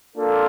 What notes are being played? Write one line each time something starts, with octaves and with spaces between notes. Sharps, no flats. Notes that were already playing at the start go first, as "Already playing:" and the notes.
A#3 D4 F4 A4